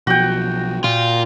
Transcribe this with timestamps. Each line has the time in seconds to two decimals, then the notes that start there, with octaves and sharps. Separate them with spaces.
0.07 B1 B2 F3 F#4 G5
0.84 A#2 F4